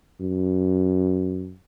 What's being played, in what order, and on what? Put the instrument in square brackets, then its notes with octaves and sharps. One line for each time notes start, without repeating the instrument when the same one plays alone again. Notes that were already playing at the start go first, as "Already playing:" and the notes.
[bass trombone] F#2